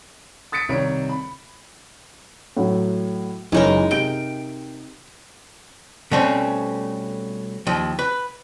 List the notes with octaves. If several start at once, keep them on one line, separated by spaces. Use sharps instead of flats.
D#6 A6 B6 C#7 D7
C2 C3 D#3 C#5 D7
B5
A2 F#3
F#1 E3 G#3 D#4 A#4 C#5
C3 G5 D7
B2 G3 A3 C4 C#4
D#2 F3
B4